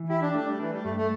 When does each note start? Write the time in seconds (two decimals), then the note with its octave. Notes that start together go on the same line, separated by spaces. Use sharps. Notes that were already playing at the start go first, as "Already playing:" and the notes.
Already playing: E3
0.09 E4 G4
0.22 D4
0.35 A3 D4
0.47 G3
0.60 E3 D4
0.72 G3
0.84 G2 A3
0.96 A3